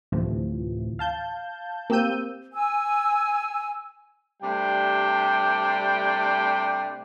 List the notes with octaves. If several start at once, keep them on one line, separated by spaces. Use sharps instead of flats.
D2 A2 C3 E3 F3
F5 A5 G6
A#3 C4 G4 E6 G6 D#7
G#5 E6
C3 G3 A3 D4 G5